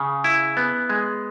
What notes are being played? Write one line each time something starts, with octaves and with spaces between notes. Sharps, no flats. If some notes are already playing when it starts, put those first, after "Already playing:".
Already playing: C#3
E4
B3
G#3